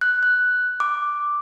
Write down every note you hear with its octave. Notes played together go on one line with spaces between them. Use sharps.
F#6
F#6
D6